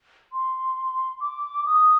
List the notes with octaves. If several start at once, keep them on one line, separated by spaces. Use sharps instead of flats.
C6
D6
D#6